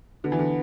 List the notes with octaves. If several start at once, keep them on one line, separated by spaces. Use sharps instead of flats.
D3 B3
E3
D3